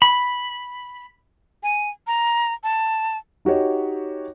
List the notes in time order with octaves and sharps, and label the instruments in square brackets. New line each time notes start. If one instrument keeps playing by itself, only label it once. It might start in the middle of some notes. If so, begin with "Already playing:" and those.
[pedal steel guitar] B5
[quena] G#5
A#5
A5
[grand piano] D#4 F#4 G4 C#5 D#5